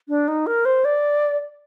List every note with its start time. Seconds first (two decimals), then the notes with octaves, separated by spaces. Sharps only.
0.09 D4
0.28 D#4
0.47 A#4
0.65 C5
0.85 D5